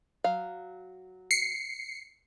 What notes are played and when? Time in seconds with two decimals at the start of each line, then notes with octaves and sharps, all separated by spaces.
0.24 F#3 F5
1.31 C7 C#7